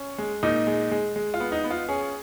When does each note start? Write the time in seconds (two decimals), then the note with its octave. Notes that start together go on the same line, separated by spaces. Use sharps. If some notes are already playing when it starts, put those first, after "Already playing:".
Already playing: C#4
0.18 G#3
0.43 A#2 D#4
0.67 G#3
0.91 G#3
1.16 G#3
1.34 F4
1.40 B3
1.52 D#4
1.64 B3
1.70 F4
1.89 C#4 G#4